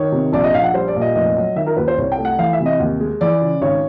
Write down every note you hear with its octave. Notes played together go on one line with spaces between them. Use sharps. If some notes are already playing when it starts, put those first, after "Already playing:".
Already playing: D#3 C#5
C3
A#1 D5
D#5
A#1 F5
F#5
G3 C5
D5
A#2
D#5
F1 D#5
F#3
D#3 E5
A#4
D#2 B4
C5
C2 C#5
G5
A3
F#5
E3 F5
E5
C3
D#5
D#2
G#3
E3 D5
C#3
G#1 C#5